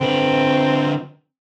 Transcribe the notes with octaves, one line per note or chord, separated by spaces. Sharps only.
D3 C4 B4